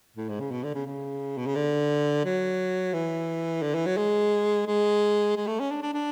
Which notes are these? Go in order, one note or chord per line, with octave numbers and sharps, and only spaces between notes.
A2
G#2
C#3
B2
D3
C#3
C#3
B2
C#3
D3
F#3
E3
D3
E3
F#3
G#3
G#3
G#3
A3
C#4
D4
D4
D4